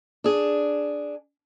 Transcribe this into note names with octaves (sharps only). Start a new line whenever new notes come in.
D4 G#4